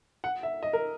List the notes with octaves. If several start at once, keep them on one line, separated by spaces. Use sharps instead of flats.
F#5
E5
D#5
A#4